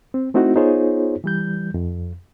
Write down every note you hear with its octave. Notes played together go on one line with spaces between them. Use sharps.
C4
A3 C4 D#4 E4 F#4
B3 D#4 F4 G#4 C5 C#5
E3 G3 G6
F2